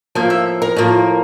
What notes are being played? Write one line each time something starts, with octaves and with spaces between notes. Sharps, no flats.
A2 F3 A#3 F5
E5
A#4
A2 F3 A#3